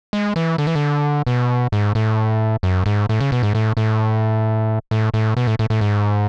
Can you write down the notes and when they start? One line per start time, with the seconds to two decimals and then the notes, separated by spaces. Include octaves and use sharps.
0.13 G#3
0.36 E3
0.58 D3
0.67 E3
0.75 D3
1.27 B2
1.72 G#2
1.95 A2
2.63 F#2
2.86 G#2
3.09 A2
3.21 C#3
3.32 B2
3.43 G#2
3.55 A2
3.77 A2
4.91 A2
5.14 A2
5.37 B2
5.47 A2
5.59 A2
5.70 A2
5.81 G#2